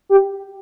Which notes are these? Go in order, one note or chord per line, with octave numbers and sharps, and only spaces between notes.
G4